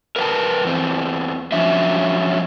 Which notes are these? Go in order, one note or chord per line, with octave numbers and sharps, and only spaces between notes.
A#4 B4 F5 G5 A5
E2 C4
F3 F#3 C#4 D4 E5